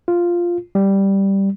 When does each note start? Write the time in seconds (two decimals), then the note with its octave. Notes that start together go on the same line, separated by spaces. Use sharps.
0.08 F4
0.75 G3